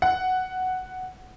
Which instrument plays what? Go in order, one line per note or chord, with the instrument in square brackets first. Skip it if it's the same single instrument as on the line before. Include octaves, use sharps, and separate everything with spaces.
[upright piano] F#5